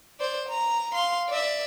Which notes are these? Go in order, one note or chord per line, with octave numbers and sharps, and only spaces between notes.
C5 D5
A#5
F5 C6
D5 E5